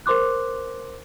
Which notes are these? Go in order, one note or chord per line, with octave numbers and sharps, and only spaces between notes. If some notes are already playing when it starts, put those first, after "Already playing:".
A#4 C5 C6 D6 F#6